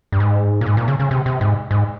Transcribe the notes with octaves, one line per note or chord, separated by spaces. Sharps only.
G2
G#2
A#2
G#2
A#2
C#3
C#3
C3
C3
G#2
G#2